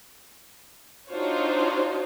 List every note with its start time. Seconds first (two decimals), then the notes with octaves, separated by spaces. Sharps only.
1.10 D4 D#4 F4 F#4 C5 C#5